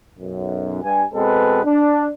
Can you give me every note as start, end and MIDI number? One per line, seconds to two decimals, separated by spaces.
0.19 0.80 35
0.19 0.80 42
0.84 1.03 43
0.84 1.03 80
1.15 1.61 47
1.15 1.61 56
1.15 1.61 60
1.15 1.61 69
1.15 1.61 71
1.65 2.10 62